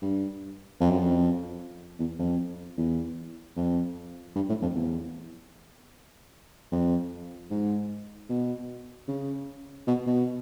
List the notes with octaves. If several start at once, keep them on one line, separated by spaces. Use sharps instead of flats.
G2
F2
F#2
F2
E2
F2
E2
F2
G2
A2
F2
E2
F2
G#2
B2
C#3
B2
B2